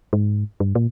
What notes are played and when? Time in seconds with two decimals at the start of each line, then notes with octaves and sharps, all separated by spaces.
0.13 G#2
0.60 G2
0.75 A#2